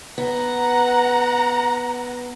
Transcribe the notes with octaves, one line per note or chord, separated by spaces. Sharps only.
B3 F#5 A#5